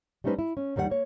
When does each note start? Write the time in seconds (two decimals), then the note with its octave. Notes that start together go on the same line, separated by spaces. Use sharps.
0.24 G3 A3 C#4 D#4 B4 C5
0.39 E4
0.57 C#4
0.76 D#2 D#3 G3 D5 F#5
0.90 A#3 C#5